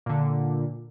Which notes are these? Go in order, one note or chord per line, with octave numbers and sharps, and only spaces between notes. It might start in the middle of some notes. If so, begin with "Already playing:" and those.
A#2 D3